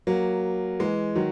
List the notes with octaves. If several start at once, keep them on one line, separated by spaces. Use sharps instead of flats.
F#3 A#3
E3 G#3
D#3 F#3